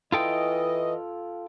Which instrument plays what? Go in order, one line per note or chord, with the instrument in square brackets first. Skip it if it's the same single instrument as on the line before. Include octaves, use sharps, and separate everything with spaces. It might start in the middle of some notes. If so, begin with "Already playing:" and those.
[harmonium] E3 D#5 [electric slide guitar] F4 A4 G5